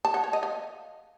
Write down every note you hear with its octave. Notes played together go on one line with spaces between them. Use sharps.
A5
F#5
C#5
D#5
F5